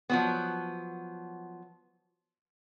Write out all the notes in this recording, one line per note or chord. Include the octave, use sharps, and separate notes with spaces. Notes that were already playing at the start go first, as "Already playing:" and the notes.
F3 F#3 B3